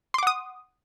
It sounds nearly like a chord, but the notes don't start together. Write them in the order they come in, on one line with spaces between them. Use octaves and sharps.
C6 D6 F#5 D#6